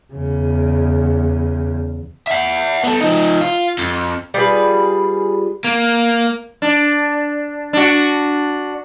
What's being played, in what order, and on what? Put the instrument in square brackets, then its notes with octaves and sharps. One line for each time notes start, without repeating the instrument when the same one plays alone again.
[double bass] E2 C#3
[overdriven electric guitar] E5 F#5
B3 A4
F3 D#4
F4
F2
[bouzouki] G3 F4 G#4 B4
[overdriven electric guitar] A#3
[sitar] D4
D4 F#4